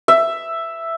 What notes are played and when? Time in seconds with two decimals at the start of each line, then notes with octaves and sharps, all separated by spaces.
0.08 E5